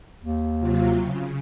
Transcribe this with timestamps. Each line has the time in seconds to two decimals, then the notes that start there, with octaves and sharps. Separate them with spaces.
0.23 D#2
0.60 C3 F#3 F4
1.00 C#3